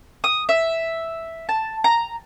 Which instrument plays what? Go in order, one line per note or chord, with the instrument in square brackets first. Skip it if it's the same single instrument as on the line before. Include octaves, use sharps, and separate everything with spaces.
[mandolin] D#6
E5
A5
A#5